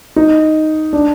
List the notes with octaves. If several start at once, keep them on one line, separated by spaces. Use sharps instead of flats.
D#4
D4